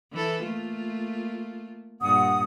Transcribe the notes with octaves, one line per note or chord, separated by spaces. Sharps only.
E3 E4 A4
A3 A#3 F4
G2 A#2 F#5 D#6